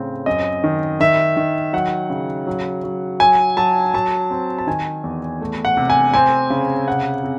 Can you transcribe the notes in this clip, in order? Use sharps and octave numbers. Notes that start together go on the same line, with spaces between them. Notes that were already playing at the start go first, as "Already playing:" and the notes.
Already playing: A2 C#3 C4
F#2 D#5
D#3
D#3 E5
D#3
F#3 F#5
C#3
F#3
F#3
F#3 G#5
F#3 A5
F#3 A5
C4
A5
D#3 G#5
E2
A3
F#5
C3
G#5
C4 G#5
C#3
C3 F#5
C3